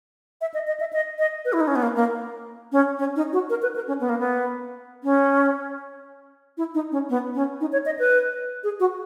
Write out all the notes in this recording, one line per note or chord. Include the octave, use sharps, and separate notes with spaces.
E5
D#5
D#5
E5
D#5
D#5
B4
E4
D#4
C#4
B3
A#3
A#3
C#4
C#4
D#4
F#4
A#4
B4
A#4
C#4
B3
A#3
B3
C#4
E4
D#4
C#4
B3
C#4
D#4
C#5
D#5
B4
G#4
F#4